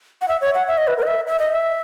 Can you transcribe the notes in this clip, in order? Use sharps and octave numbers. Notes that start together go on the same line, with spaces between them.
F#5
E5
C#5
F#5
E5
D#5
B4
A#4
D#5
E5
E5
D#5
E5